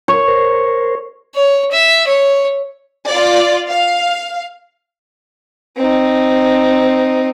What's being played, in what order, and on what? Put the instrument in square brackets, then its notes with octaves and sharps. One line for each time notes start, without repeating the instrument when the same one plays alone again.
[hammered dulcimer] C#5
[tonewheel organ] A#4 C5
[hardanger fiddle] C#5
E5
C#5
[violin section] F4 D5
F5
[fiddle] C4 D#4